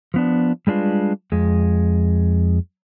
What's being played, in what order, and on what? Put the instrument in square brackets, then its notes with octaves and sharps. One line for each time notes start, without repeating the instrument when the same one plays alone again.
[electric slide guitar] F3 B3 D4
G3 G#3 D4 F4 B4
F2 G#3